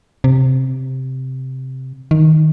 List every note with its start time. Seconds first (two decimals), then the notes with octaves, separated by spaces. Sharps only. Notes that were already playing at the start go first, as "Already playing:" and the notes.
0.24 C3
2.11 D#3